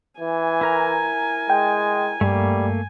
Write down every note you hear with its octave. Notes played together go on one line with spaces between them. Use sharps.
E3 G#5
E4 A#4 A#5
G#3 G5
G2 G3 A3 A#3